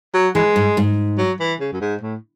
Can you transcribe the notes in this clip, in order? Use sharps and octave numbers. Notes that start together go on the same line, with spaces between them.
F#3
E3 G#3
G#2
G#2
F#3
E3
C#3
F#2
G#2
A2